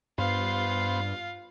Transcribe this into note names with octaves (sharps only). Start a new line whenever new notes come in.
G2 B3 F4 C5 F5